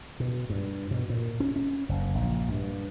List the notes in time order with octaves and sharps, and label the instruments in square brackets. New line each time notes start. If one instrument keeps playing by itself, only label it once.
[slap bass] B2
G2
B2
A#2
C#4
C#4
F#1
A#1
G2